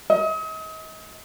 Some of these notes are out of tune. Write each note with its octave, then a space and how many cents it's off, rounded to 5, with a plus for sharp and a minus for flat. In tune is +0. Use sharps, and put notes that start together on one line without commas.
D#5 +40